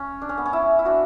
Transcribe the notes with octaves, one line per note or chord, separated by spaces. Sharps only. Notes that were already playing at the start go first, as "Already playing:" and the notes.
Already playing: C#4
D4
C#4
B3
C#4
E4
E4
D4 F#4